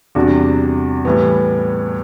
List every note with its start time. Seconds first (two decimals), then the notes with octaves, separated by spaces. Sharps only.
0.15 E2 C3 G3 D4 F#4
1.05 A2 E3 G3 B3